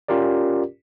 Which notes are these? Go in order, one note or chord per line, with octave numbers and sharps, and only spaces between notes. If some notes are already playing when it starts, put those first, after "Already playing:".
C#4 F4 G4 A#4 D5